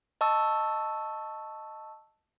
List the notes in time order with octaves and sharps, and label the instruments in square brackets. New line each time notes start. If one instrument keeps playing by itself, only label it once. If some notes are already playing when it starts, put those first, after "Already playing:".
[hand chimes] D#5 A5 C#6 E6